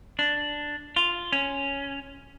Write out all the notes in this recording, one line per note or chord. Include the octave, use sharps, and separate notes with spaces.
D4
F4
C#4